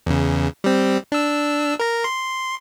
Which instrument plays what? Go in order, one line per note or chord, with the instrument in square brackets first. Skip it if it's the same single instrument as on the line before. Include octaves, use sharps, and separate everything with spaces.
[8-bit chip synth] E2 C#3
G3 C4
D4 E6
A#4 A#5
C6